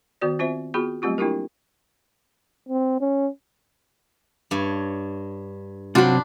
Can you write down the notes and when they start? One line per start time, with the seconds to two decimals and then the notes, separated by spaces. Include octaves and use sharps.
0.21 D#3 B3 F#4 D5
0.39 C4 F4 C5 E5
0.74 B3 F4 F#4 G#4 B5
1.02 F#3 G3 A3 C4 F4 G4
1.18 A#3 D4 E4 F4 G4 A#4
2.69 C4
3.01 C#4
4.51 G2 C#5
5.95 C3 F#3 C4 D4 F4 F#4 B5